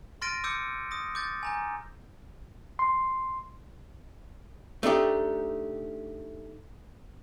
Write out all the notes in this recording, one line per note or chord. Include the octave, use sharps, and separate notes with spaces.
C6 F6 A6 A#6 D7 D#7
D6 E6 G6 C#7
D#6 A#6
D6 G6 A6
G#5 A#5 G6
C6
A3 D4 D#4 G4